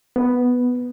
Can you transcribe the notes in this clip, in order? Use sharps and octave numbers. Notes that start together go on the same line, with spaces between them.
B3